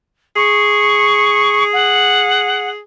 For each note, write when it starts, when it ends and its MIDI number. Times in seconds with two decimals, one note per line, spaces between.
0.36 2.79 68
0.36 1.63 85
1.73 2.70 78